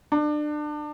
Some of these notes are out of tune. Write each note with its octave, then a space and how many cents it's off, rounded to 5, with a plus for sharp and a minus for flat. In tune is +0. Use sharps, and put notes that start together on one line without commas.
D4 +30